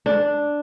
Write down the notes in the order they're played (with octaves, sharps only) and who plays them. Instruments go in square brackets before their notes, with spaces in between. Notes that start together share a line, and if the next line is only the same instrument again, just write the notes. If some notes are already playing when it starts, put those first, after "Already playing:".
[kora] D4